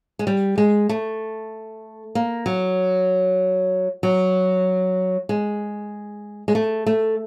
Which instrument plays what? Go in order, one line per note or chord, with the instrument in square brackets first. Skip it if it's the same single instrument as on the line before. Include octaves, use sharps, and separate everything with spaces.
[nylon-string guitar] G#3
G3
G#3
A3
A#3
F#3
F#3
G#3
G#3
A3
A3